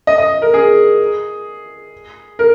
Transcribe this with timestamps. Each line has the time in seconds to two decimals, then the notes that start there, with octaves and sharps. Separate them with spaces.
0.07 D#5
0.18 D#5
0.42 A#4
0.54 G#4
2.39 A#4